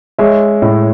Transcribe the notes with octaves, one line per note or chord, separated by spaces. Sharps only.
G#3 C#5 E5
A2